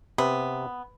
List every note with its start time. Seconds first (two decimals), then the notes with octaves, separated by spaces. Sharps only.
0.18 C3 B3